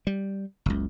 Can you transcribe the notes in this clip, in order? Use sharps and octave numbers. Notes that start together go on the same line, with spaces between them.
G3
F#1 C#2